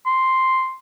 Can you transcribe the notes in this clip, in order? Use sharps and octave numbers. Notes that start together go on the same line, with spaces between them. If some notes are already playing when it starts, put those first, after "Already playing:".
C6